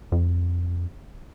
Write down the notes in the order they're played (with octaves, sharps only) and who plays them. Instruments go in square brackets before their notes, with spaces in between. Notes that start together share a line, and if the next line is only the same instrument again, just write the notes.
[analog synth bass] F2